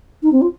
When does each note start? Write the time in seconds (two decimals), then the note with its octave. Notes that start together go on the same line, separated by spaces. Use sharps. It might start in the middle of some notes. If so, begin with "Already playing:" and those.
0.22 D#4
0.32 C4
0.41 F4